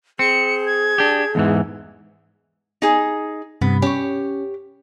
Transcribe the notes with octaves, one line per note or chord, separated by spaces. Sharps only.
C4 G#4 C#7
G#6
D4 G4
E2 G#2 E3
D#4 G#4
G2 C3 B3
C#4 G4 C#5